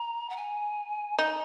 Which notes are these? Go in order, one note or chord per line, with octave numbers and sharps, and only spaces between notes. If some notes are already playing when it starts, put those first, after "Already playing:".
Already playing: A#5
F#5
G#5
D#4 A#5